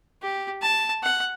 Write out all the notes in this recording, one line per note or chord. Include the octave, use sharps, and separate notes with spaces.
G4
A5
F#5